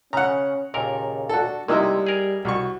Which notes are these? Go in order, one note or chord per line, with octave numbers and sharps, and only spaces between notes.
C#3 C#4 F#5 A#5
D#2 A#2 C#3 A#4
D4 F#4 A4
C3 G3 G#3 A#3 D#4 E4
G#4 A#4
C2 F#4 C#6